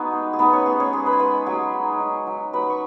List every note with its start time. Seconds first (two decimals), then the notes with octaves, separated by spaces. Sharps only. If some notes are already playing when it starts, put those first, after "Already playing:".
Already playing: B3 D#4 F#4 G#4 B4 D#5 F#5
0.13 G#3
0.33 G#4
0.39 B3 D#4 B4
0.53 C#4 C#5
0.66 B3 G#4
0.80 C#4 C#5
0.93 G#3 G#4
1.06 B4 B5
1.13 G#5
1.19 G#3 B4 B5
1.46 F#3 G#4 G#5
1.73 D#4
2.00 D#4
2.27 F#3
2.53 F#3 B4 B5
2.70 C#6